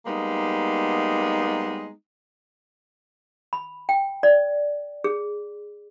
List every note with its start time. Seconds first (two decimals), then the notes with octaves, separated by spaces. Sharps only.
0.06 G3 G#3 A#3 B3 D#4
3.53 B5
3.89 G5
4.23 D5
5.04 G#4